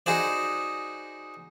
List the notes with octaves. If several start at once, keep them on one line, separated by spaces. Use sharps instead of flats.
D#4 F#4 G#4 C5 D5